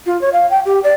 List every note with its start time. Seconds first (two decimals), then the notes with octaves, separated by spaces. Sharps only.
0.06 F4
0.21 C#5
0.33 F5
0.50 G5
0.65 G4
0.84 D5